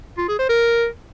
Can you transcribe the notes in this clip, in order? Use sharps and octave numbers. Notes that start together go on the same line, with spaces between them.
F4
G#4
C5
A#4